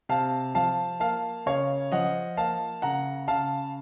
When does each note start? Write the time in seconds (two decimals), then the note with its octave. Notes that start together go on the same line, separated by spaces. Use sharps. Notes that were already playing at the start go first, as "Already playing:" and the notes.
0.09 C3 F5 A5
0.55 F3 F5 A5
1.00 A#3 F5 A5
1.46 C#3 C#5 F5
1.92 F3 D#5 F#5
2.37 A#3 F5 A5
2.82 C#3 F#5 A#5
3.28 C#3 F5 A5